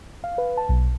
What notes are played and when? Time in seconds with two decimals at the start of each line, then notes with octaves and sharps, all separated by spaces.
0.24 F5
0.38 B4
0.57 A5
0.69 B1